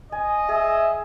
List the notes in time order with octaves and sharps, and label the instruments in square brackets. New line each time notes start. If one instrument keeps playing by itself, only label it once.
[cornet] D#5 [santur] G#5
[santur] G#4 [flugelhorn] E5